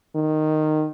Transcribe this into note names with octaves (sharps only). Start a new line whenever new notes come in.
D#3